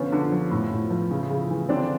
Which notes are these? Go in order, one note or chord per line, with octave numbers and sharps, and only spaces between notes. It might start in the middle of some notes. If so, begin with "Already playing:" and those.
Already playing: D3 F3 B3 C#4
D3
F3
A2
A2
F3
C#3
C#3
E3
D3 C4 D4